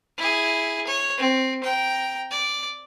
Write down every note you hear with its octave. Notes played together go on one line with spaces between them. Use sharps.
E4 G#4
C#5
C4
G5 A#5
D5